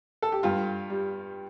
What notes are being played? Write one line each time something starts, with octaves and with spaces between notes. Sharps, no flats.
A4
G4
G2 F4
G3